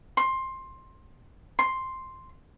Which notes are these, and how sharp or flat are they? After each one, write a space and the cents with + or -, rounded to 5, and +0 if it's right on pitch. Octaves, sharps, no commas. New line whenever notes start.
C6 +15
C6 +5